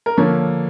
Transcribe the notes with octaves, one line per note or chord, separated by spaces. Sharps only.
A#4
D3 F3 A#3 C#5